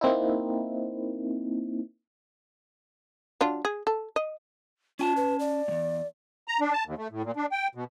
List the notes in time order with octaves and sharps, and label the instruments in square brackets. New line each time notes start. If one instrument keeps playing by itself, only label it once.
[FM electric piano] A#3 C4 D#4 E4
[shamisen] F#3 D4 F4
G#4
A4
D#5
[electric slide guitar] C#4 G#5 A5 [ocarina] F4
[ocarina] B4
D5
[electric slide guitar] E2 A2
[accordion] A#5
D4
A5
D#2
A3
A2
A#2
D4
G5
B2